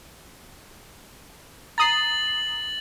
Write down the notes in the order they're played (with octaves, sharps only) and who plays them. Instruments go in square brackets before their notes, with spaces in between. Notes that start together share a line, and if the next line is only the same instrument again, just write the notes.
[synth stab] A#5 D#6 C7 [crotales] A6 F#7